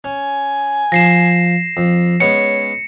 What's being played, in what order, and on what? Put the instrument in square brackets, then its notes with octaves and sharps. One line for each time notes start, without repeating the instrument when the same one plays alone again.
[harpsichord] C#4 [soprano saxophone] G#5
[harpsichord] F3 [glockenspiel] A#6 C7 E7
[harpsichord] F2
[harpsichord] G#3 B3 C#4 [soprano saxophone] C#5 [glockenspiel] C#7